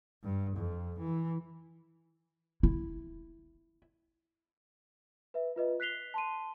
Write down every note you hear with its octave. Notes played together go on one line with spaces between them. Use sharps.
G2
F2
E3
E4
B4 E5
F4 B4 D#5
F#6 B6 C7 F7 G7
A5 C6 D#7